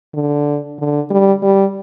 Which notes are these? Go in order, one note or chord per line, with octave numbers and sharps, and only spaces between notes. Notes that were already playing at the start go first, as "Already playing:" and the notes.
D3
D3
G3
G3